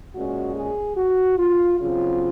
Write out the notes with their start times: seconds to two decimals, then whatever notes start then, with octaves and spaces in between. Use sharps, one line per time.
0.14 A#2 G#3 C#4 F#4
0.56 G#4
0.97 F#4
1.38 F4
1.79 C#3 F#3 C4 F4